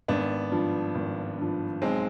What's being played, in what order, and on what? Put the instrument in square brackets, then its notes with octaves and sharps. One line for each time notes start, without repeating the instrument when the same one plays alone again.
[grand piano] G#1 [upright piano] B3 D4
[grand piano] G2 F3
G#1
G2 F3
[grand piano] B1 [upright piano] G#3 C4